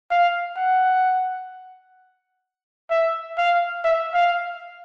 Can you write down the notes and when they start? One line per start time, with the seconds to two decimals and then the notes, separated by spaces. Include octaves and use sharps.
0.10 F5
0.57 F#5
2.90 E5
3.38 F5
3.84 E5
4.14 F5